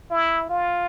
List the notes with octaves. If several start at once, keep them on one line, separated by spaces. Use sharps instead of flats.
E4
F4